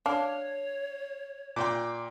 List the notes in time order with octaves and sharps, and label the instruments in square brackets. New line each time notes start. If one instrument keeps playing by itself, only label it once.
[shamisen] D4 [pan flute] C#5 [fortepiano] F5
[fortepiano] A#2 [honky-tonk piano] G5 C6 D6